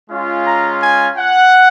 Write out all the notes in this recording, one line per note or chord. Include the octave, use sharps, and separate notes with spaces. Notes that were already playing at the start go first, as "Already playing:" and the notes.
G#3 C#4 F4
A#5
G#5
F#5